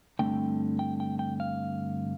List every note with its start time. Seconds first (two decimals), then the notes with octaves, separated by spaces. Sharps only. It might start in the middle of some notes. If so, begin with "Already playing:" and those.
0.19 G2 D3 A3 C4 G5
0.79 G5
1.00 G5
1.19 G5
1.40 F5